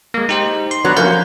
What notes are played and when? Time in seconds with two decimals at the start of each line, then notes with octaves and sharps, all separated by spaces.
0.14 G#3 A#3
0.29 D#4 G4 C5
0.71 C6
0.85 F#3 B3 D4
0.97 F3 A3 A#3 C#4 F#5 G6